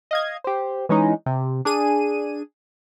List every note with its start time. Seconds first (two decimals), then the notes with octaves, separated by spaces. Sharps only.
0.11 D#5 F5 G#6
0.44 G4 C5
0.89 E3 G#3 C#4 D#4
1.26 C3
1.65 D4 G#4 D#7